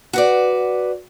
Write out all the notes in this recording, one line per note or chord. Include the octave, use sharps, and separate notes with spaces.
F#4 B4 D5